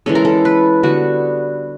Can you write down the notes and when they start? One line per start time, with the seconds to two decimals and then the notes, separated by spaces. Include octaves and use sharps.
0.06 E3 G#3 C#4 A4
0.15 A#4
0.25 A4
0.45 B4
0.83 D3 G3 B3 F#4